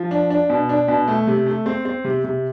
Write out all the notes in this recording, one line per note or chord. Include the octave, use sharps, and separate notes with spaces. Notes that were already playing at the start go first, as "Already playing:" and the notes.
Already playing: F3
D4
D4
B2
D4
B2
A3
C3
A3
C4
C4
C3
C3